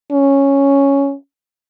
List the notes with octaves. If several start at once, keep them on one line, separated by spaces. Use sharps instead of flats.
C#4